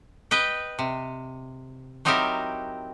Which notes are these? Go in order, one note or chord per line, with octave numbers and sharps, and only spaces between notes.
B4 D#5 G5
C3
F#3 C4 D#4 E4 G4 A#4